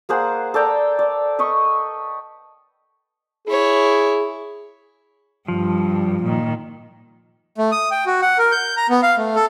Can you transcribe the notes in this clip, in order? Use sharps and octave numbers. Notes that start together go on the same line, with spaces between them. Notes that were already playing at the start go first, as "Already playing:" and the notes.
A#3 G#4 C5 F#5
A4 D5 G5 A#5
D5
B4 D#5 G5 C#6
E4 G#4 C#5
G2 F3
A#2 D#3
A3
D#6
G5
F#4
F#5
A#4
G6
A#5
B3
F5
A3
A4